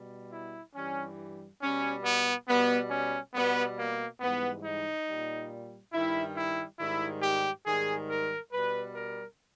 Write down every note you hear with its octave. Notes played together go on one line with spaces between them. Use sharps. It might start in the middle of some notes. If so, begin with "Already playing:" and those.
Already playing: B2 G3
E4
G2 E3 G3 C#4
B2 G3 C#4
B3
B2 G3 B3
C#4
B2 G3 B3
A#3
G#2 E3 G3 B3
D#4
A#2 G3
G2 D#3 G3 E4
E4
G#2 D#3 G3 E4
G4
G#2 D#3 G3 G#4
A#4
B2 G3 B4
A#4